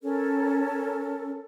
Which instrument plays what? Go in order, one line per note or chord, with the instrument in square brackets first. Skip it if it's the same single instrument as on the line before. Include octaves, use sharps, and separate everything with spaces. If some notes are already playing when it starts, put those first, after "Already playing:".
[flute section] C#4 A4 A#4